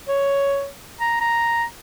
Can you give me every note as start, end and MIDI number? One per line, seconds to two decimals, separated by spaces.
0.08 0.68 73
1.01 1.17 82
1.21 1.64 82